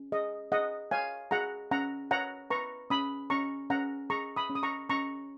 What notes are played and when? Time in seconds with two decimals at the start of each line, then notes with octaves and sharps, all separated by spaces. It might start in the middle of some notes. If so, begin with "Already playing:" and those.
Already playing: C#4
0.12 G#4 D#5
0.52 G#4 D#5 F#5
0.91 C#5 F5 G#5
1.31 G#4 F#5 A#5
1.71 C#4 F#5 A#5
2.11 C#5 F#5 A#5
2.50 B4 A#5 C#6
2.90 C#4 B5 D#6
3.30 C#4 A#5 C#6
3.70 C#4 F#5 A#5
4.10 G#4 A#5 C#6
4.36 B5 D#6
4.50 C#4
4.55 D#6
4.63 A#5 C#6
4.90 C#4 A#5 C#6